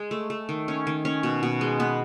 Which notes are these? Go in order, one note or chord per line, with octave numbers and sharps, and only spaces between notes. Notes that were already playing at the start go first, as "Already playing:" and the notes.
Already playing: G#3
A3
A3
D#3
C#4
D#3
C#4
B2
B2
G#3
B3